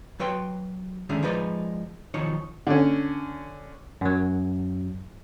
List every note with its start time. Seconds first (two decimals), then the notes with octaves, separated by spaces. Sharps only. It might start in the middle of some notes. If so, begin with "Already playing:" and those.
0.20 F#3 B4 C#5 G5 C6
1.09 D3 D#3 G#3 A3 C#4
1.23 F3 G#3 D#4 B4 D5
2.14 B1 D#3 F3 D#4 C#5
2.67 D3 C#4
4.01 F#2 F#3